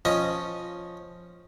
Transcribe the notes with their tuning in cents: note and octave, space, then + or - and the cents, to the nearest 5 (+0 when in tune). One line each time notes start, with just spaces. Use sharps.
F3 +0 C#4 -10 D#5 +0